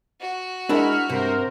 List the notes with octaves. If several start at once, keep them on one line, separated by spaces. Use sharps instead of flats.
F#4
G#3 D4 E4 A#4 B5 F6
G2 C3 A#4 C5